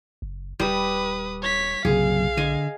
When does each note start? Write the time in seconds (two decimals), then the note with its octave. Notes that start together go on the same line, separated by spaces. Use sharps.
0.22 F#1
0.60 D#1 G3 B4 D#6
1.42 C#5 B6
1.85 F#1 B1 C3 F#3 G#4 F5
2.37 D3 D#5 G#5